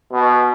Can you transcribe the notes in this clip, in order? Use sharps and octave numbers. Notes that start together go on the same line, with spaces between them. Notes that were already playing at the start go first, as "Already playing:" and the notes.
B2